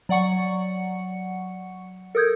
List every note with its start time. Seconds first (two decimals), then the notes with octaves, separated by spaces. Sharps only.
0.09 F#3 D5 F#5 C#6 C#7
2.15 A4 A#4 D#6 G6 G#6